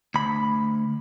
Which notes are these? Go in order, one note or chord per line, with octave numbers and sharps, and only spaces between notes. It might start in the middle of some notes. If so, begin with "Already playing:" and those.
D2 B5